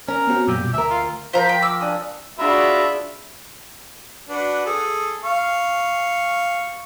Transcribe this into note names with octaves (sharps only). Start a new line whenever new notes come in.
C#4 A#4
B3 C4 F#4
F#2 A#2 G3 G4 E6
B2
D2 A#4 E5 G#5 A#5
F4
F3 A#4 C5 A#5 B6
G5
D6 E6
D4 G#5 D#6
D4 F4 F#4 G#4 E5 B5
D4 F#4 B4
G#4 A4
F5 C#6